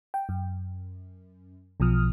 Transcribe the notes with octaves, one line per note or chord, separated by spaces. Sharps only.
G5
F#2
B1 B2 F3 D#6 F6